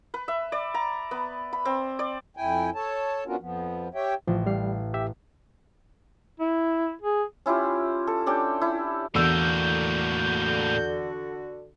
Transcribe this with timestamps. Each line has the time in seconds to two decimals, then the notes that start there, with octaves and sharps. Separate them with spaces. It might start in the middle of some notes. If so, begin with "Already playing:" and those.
0.14 B4
0.28 E5
0.52 D5
0.74 A#5
1.11 B3
1.53 B5
1.65 C4
1.99 D5
2.37 F2 E4 G5 G#5
2.75 A4 C#5 A5
3.26 B3 C#4 D4 F4 F#4 A#4
3.40 F2 F3 B3
3.95 G4 C#5 E5 G5
4.27 A1 F3
4.46 G3 F5
4.94 G4 E5
6.40 E4
7.01 G#4
7.46 C#4 E4 F4 G4
8.07 A4
8.26 C#4 D4 G4 G5
8.61 E4
9.15 E2 A2 D3 A#3 F#4 E6 G6